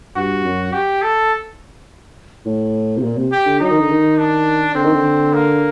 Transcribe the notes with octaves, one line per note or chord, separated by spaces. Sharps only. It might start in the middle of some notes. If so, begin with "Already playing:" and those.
G2 F#4
F#2
G4
A4
A2
C3
A#2
C3
G4
D3
F#3 D#4
D#3
D3
D#3
D4
D3 C4
D#3
D3
A#3